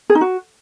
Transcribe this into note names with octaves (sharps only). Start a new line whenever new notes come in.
G#4
D#4
F#4